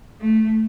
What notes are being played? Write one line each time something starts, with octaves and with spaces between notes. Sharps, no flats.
A3